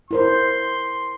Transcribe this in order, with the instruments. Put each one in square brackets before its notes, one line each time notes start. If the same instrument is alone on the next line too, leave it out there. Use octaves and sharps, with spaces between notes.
[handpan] E4 A#4 C5 [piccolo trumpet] C6